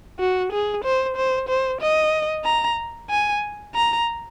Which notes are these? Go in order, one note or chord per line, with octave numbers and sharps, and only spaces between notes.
F#4
G#4
C5
C5
C5
D#5
A#5
G#5
A#5